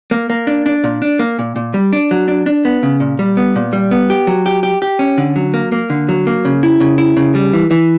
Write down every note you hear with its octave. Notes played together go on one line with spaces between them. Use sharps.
A#3
A#3
D4
D4
A#2
D4
A#3
A#2
A#2
G3
D4
F#3
D4
D4
B3
C#3
A#2
G3
B3
A#2
G3
B3
G4
F#3
G4
G4
G4
C#4
D3
F#3
A#3
A#3
D3
F#3
A#3
C#3
E4
C#3
E4
C#3
G3
E3
E3